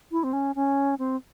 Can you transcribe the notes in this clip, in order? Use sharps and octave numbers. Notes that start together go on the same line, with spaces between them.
E4
C4
C#4
C#4
C4